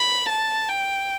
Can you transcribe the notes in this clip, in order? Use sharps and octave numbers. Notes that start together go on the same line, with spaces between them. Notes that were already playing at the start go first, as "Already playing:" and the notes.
Already playing: B5
A5
G5